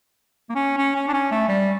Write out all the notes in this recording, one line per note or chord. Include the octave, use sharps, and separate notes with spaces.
A#3
C#4
C#4
C#4
D4
C#4
A3
G3